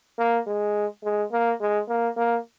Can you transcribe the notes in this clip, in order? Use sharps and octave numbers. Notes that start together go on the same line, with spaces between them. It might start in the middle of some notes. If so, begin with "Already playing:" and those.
A#3
G#3
G#3
A#3
G#3
A#3
A#3